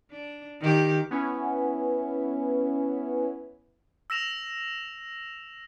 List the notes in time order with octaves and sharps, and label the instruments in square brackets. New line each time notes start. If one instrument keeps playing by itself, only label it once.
[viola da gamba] D4
D#3 G4
[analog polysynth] B3 C#4 E4
[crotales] E6 A#6 E7 F7